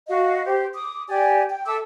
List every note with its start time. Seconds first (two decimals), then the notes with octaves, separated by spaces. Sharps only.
0.09 F#4 D#5 F5
0.46 G4 C5
0.74 D6 D#6
1.09 G4 D5 G#5
1.51 G5
1.66 A4 E5 D6 E6